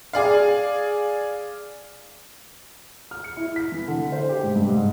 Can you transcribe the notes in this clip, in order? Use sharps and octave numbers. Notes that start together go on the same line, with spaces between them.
G#4 D5 F5
F6
C#7
E4
B6
E3
D3
C5
G4
G#2
G2
G#2